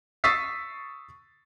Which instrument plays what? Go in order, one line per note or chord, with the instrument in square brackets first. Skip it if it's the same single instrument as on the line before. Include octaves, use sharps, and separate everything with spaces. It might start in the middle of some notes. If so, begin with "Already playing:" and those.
[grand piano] C#6 D#6 E6 A6 B6 C7